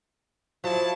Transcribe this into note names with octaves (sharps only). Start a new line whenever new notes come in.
F3 F#3 E4 A5